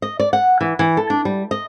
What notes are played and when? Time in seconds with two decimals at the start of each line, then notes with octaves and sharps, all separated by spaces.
0.02 D#5
0.19 D5
0.33 F#5
0.61 E3
0.79 E3
0.97 A4
1.10 D4
1.25 G3
1.51 D#5